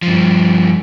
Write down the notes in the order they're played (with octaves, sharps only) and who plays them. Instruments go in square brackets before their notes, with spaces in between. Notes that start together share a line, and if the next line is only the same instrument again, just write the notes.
[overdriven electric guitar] G2 F3